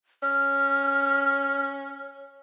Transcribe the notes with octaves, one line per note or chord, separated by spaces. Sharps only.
C#4 F6